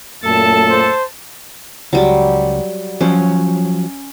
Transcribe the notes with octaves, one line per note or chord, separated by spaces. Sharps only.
F#2 A#2 A3 A4 A5
C5
C#2 F#3 G3
F3 F#3 C#4